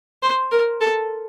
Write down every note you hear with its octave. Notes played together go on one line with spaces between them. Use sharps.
C5
A#4
A4